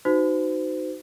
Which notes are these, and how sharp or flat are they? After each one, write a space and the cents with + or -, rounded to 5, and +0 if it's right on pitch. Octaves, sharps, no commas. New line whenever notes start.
D#4 -10 F#4 +0 C5 -40